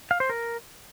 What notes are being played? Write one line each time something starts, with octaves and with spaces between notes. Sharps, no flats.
F5
C5
A#4